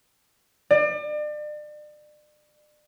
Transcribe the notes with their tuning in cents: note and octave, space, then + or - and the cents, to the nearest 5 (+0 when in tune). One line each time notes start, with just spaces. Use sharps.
D5 +35